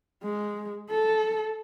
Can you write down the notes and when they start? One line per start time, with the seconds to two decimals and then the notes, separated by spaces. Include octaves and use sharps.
0.24 G#3
0.90 A4